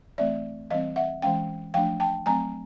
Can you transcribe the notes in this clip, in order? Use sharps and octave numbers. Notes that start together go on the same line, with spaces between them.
E3 A3 C4 D5 E5
E3 G3 C4 D#5 F5
E5 F#5
E3 G#3 C#4 F5 G5
F3 A3 D4 F5 G5
G5 A5
F#3 A3 C4 G#5 A#5